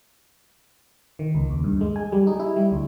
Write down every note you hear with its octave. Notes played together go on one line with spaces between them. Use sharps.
D#3
C#2
D#2
G2
G#3
G#5
G3
D#4
E4
G3
D2